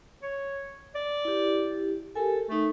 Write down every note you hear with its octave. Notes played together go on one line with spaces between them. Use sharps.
C#5
D5
E4 G4
G4 A4 A#4 G#5
A3 D#4 A4